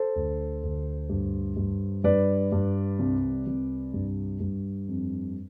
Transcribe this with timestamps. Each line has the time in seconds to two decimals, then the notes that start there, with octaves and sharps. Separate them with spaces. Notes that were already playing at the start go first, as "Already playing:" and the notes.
Already playing: A4 C5
0.16 D2
0.63 D2
1.09 G2
1.57 G2
2.04 G2 B4 D5
2.52 G2
2.99 C2
3.47 C2
3.94 G2
4.40 G2
4.88 F2